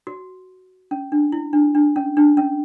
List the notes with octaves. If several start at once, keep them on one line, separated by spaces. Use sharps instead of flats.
F#4
C#4
D4
E4
D4
D4
C#4
D4
C#4